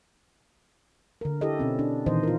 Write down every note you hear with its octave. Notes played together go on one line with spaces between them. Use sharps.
D3 A#4
E4 G4 A4 D#5
B2 C4 C#4
D4
A#2 D#3 E3 C5 D#5
F4 A#4